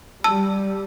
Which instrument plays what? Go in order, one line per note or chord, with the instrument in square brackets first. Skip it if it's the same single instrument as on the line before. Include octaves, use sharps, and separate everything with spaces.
[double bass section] G3 [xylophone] A5 E6